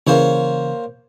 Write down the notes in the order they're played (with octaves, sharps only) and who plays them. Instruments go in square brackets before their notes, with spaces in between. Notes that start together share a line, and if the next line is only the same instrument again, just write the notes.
[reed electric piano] C#3 E3 [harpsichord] A#3 C5 C#5